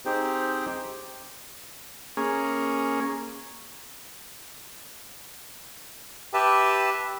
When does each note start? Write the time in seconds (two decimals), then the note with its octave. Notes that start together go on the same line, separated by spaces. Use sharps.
0.05 C4 D#4 G4 G#4 C5 G5
2.17 A#3 C#4 G#4
6.34 G4 B4 E5 A5